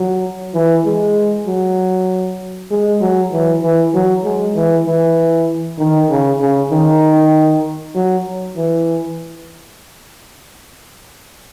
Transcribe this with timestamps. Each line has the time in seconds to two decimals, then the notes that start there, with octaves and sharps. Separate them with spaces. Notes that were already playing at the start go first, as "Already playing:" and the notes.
Already playing: F#3
0.54 E3
0.86 G#3
1.47 F#3
2.71 G#3
3.01 F#3
3.32 E3
3.62 E3
3.94 F#3
4.25 G#3
4.55 E3
4.86 E3
5.79 D#3
6.10 C#3
6.41 C#3
6.71 D#3
7.95 F#3
8.56 E3